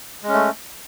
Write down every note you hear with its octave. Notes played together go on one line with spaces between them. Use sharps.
G#3 A3 C#4